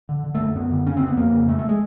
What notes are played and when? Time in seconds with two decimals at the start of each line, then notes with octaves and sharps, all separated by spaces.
0.09 D3
0.24 D3
0.35 A3
0.40 F#2
0.55 F#2 B3
0.71 D3
0.86 C#3 C#4
0.97 C4
1.02 F2 B3
1.17 F2 A#3
1.33 C#3
1.47 C3 A3
1.59 A3
1.69 G#3